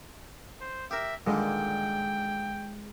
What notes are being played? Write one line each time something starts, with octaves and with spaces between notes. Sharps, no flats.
C5
G4 A#4 E5
A#2 D3 D#3 G#3 G5